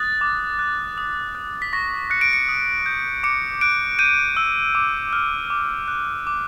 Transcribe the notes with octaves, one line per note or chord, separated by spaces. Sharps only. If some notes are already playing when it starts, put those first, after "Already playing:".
Already playing: D#6 F#6 A6
D6
F#6
D#6
F#6
B6
C#6 A#6
F#6 C#7
D7
C#7
D#6
G6
D6 C#7
F#6 D7
G6 D#7
E6
D6
F6
D6
F#6
D6